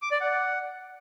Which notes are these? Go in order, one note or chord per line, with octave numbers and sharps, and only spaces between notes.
D6
D5
F#5